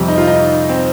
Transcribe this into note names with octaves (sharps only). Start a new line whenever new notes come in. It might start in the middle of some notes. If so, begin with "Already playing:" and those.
Already playing: F2 C3 G3
D#4
F4
D#4
C4